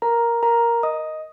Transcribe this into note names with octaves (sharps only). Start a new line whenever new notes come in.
A#4 A#5
A#4 A#5
D#5 D#6